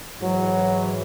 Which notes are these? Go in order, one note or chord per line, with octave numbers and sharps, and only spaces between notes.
G#2 E3 F#3